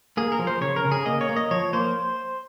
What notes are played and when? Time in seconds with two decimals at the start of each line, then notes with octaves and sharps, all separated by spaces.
0.17 A#3 G#4
0.32 A#4
0.39 F3
0.47 C5
0.61 C#3 C#5
0.76 A#4
0.85 C#3
0.92 G#4
1.06 A#3 D#5
1.21 C#5
1.29 A#3
1.36 D#5
1.51 F3 C#5
1.73 A#3 C5